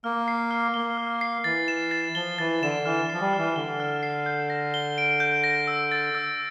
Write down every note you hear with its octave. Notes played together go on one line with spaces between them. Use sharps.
A#3 F6
C7
F6
A#3 G7
F6
C7
E3 A6
E7
A6
F3 G7
E3 A6
D3 E7
E3 F6
F3 C7
G3
F6
E3
D3 G7
F6
C7
G6
A#6
G7
D7
G6
A#6
E6
A6
E6